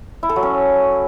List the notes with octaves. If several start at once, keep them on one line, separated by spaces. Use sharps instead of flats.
E4
A4
F#3
C#4